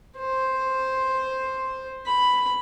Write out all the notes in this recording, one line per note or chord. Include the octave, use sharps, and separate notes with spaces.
C5
B5